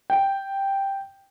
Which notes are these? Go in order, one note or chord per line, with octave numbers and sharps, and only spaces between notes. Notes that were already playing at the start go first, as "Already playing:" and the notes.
G5